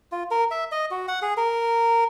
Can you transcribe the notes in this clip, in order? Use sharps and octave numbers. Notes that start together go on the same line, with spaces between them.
F4
A#4
E5
D#5
F#4
F#5
G#4
A#4